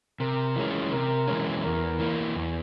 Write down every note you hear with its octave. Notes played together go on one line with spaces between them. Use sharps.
C3 A#4
E3 G#3 C#4
C3 A#4
E3 G#3 C#4
E2 A#4
E3 A#3
E2